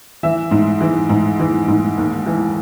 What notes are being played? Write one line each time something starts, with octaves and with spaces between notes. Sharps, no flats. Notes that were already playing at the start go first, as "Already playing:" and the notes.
E3 E5
G#2
E3
G#2
E3
G#2
D#2
E3